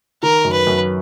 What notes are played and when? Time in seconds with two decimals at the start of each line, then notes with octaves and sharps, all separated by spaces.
0.23 D#3 A#4
0.45 F#2
0.52 B4
0.67 F#2